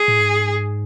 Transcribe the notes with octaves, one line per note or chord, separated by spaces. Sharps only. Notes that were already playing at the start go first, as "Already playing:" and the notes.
Already playing: G#4
A2
G#2